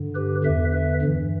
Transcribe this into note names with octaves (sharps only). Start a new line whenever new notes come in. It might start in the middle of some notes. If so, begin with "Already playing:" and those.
Already playing: G2 D3
G4 B4
E2 D3 B4 E5
B4 E5
G2 E3